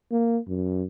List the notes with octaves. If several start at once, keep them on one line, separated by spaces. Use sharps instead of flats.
A#3
F#2